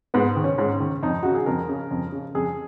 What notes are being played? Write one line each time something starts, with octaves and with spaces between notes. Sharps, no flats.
G#2 B3
D#3
C#4
G#2 C#4
D#3
F2 D#4
C#3 F#4
G#4
F2 A#4
C#3
F2
C#3
F2 G#4